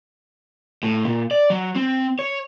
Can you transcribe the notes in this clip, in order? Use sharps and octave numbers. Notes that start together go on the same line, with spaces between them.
A2
A#2
D5
F#3
C4
C#5